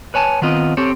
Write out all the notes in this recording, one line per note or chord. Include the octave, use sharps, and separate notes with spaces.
B4 C#5 G#5 A5
D#3 B3 C4 F4 D#5
C4 G4 A4 C#5